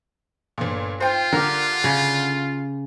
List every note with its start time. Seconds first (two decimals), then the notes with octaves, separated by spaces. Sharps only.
0.58 G1 A#2
1.00 F4 C5 G5
1.33 D3 G4 A#4
1.84 C#3